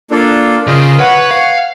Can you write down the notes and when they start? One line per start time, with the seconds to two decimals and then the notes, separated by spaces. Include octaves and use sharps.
0.11 A#3 D4 F4 A4
0.67 C#3 C#4 F4 G#4 A#4 C5 D#5
0.99 B4 C#5 F#5
1.31 F5